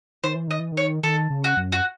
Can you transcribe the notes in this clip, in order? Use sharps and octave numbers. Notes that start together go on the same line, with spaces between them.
D#3 C5
E3
D#3 D#5
E3
D#3
C#5
D#3 A4
C#3
F#4
F#2
F#4